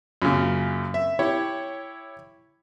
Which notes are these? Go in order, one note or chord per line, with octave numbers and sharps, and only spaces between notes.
F#2 A#2 C#3
E5
E4 G4 C#5